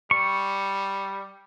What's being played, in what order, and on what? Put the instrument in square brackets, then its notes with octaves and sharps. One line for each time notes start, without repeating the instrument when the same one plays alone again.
[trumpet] G3 [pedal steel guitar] C#6